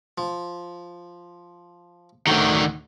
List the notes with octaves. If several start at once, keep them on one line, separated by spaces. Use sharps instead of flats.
F3
D2 A2 D3 D#3 F#3